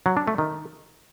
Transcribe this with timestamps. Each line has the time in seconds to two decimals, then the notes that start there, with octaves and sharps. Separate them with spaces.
0.06 F#3
0.17 D4
0.28 A3
0.38 D#3